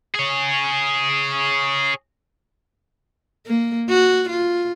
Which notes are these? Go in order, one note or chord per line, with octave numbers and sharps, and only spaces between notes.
G#4 C#5
A#3
F#4
F4